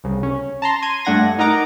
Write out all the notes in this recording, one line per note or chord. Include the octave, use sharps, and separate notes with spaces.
C2 C#3
C#4
A5 A#5 C6
C6 G#6 D#7
G2 A3 D4 F#5 G#6 A#6
D#4 A#4 D#5 F#5 A#5 D6